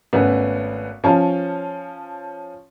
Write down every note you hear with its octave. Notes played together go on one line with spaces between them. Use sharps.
G#1 A3 B3 C#4
F3 C#4 C#5 F5 A5